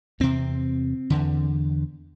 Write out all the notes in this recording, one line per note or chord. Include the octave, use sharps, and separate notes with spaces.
E2 C3 C4
E2 D3